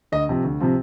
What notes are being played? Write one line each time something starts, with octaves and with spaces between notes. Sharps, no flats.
D2 D#5
C3 F3 C4
D2
C3 F3 C4